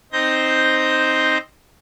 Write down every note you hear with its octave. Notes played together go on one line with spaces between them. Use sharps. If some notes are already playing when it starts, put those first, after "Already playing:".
C4 D#4 C5 G6 A#6